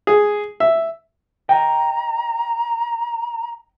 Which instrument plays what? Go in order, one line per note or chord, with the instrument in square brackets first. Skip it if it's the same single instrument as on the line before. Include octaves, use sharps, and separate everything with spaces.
[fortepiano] G#4
E5
[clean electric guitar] D#5 G5 [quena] A#5